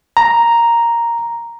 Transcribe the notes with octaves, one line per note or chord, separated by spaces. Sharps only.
A#5